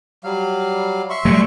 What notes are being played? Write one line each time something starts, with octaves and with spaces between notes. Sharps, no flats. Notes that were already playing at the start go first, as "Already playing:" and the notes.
F#3 G3 F5
E5 C6 C#6
F#3 G3 A3